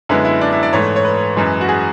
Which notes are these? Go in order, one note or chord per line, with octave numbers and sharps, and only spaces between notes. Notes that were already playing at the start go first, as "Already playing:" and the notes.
F#2 D3 G#3 B3 E4
E4
D4
E4
D5
G#2 E3 A3 C#5
C#5
B4
F#2 E3 G#3
F#4
G#4